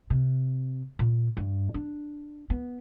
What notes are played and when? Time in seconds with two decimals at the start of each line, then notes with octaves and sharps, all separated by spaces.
0.10 C3
0.99 A#2
1.37 G2
1.74 D4
2.50 B3